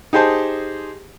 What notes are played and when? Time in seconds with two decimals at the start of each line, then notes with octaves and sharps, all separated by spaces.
0.13 D#4 G4 G#4 C5 A5